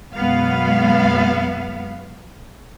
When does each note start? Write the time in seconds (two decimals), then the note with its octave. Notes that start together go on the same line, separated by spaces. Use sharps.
0.15 F#2 B2 G#3 B3 F5